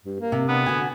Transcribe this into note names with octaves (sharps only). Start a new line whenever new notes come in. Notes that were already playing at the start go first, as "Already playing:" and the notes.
G2
A#3
C3
B3 D4
D3 F#4 G#5